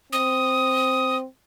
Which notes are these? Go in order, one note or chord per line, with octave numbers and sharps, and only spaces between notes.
C4 D#6